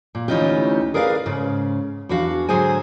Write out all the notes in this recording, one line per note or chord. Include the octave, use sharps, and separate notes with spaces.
A#2
D2 E3 C#4 D#4 F4 G4
G#4 A#4 B4 D5 F5
G#2 C#3
E2 E3 D4 F#4 F5
G#2 D3 F#3 G#4 C5 G#5